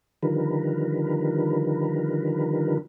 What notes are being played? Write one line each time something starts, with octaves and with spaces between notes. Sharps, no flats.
D3 D#3 F3 G3 A#4 B4